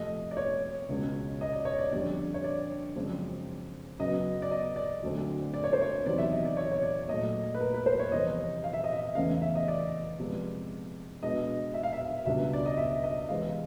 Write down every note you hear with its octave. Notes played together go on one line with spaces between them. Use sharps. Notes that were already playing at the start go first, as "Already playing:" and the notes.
Already playing: F2 C3 F3 A3 D#5
D5
C#5
C#2 B2 G#3 C#4
D#5
D5
C#5
D5
F2 D3 G3 D5
C#5
D5
F#2 C#3 F3 G#3 C4
F#2 C#3 F#3 B3 D#5
D5
D#5
D5
D2 D3 F#3 A3 C4
D5
C#5
C5
C#5
E2 C3 D#3 F#3 D5
E5
D#5
D5
C#5
C#5
D5
A#2 F#3 A3 D#5
B4
A#4
B4
C5
C#5
F2 C3 E3 G3 D#5
F5
E5
D#5
E5
E2 C#3 E3 A3 C#4 F5
E5
D#5
D5
C3 F3 G#3 B3
B2 G#3 B3 D4 D#5
E5
F5
E5
C#2 B2 G3 B3 D4 E5
D5
D#5
E5
D#5
C3 E3 G#3 C4 F5